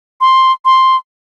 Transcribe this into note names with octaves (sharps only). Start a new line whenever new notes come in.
C6
C6